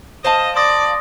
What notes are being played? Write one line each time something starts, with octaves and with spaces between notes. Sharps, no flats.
C5 D#5 F5 A5
D5 C6 D#6 A#6